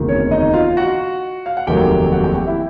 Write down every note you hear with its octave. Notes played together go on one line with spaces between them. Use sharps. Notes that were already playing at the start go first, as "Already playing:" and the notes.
Already playing: E1 D2 C3 D#3
C#4 C#5
D#4 D#5
F4 F5
F#4 F#5
F5
F#5
F1 D#2 D#3 F#3 G4 G5
F#4 F#5
G4 G5
G4 G5
E4 E5